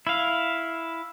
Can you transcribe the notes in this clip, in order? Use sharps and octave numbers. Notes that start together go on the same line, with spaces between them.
E4 F5